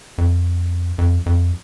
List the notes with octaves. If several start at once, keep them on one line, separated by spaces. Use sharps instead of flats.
F2
F2
F2